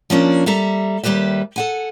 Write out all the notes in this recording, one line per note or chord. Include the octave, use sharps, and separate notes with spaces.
F3 A#3 C#4 D4
G3 A4 E5 A#5
D#2 G3 G4 B4 E5
A4 F#5 G#5